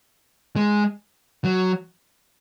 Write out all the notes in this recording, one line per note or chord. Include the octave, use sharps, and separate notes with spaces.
G#3
F#3